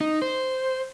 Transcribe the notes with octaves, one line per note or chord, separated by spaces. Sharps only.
D#4
C5